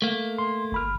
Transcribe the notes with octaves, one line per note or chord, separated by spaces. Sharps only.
A3 A#3
C6
G1 B5 F6